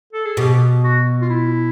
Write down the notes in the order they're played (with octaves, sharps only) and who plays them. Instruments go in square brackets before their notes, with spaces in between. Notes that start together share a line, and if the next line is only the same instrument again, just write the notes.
[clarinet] A4
G#4
[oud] B2 [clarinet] G4
[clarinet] F#4
F4
E4